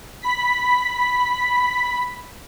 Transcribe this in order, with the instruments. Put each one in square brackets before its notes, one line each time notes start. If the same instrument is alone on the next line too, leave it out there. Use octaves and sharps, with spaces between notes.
[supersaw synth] B5 B6